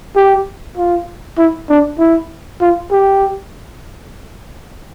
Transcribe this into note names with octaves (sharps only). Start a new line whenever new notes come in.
G4
F4
E4
D4
E4
F4
G4